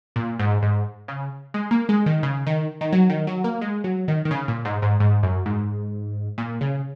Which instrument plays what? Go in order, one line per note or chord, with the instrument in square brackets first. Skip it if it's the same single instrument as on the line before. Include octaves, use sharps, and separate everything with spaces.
[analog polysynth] A#2
G#2
G#2
C#3
G#3
A#3
G#3
D#3
C#3
D#3
D#3
F#3
D#3
F#3
A#3
G#3
F#3
D#3
D#3
C#3
A#2
G#2
G#2
G#2
F#2
G#2
A#2
C#3